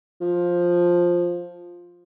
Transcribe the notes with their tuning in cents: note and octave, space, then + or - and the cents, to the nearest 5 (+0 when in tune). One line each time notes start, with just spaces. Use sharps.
F3 +5